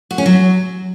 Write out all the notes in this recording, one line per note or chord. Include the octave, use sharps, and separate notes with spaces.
F#4
C#4
F#3